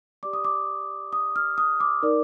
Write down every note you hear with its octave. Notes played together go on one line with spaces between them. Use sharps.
G4 D5 D6
D#6
D6
D#6
F6
D#6
D6
D#4 A#4 D5